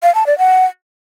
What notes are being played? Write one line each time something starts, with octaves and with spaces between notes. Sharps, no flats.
F5
A5
D5
F#5